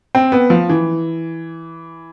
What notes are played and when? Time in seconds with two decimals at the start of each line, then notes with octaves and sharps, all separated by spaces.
0.15 C4
0.32 B3
0.50 F3
0.69 E3